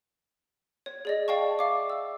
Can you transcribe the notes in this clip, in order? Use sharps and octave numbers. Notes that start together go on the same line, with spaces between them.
C#5
G#4 D5 D#5
D5 F5 G5 A5 C#6
D5 E5 F5 D6
E6